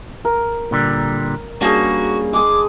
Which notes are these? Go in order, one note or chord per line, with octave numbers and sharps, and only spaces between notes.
A#4
A#2 D3 G3
G3 A#3 C#4 D4 F#4 G#4
G#3 G#4 D6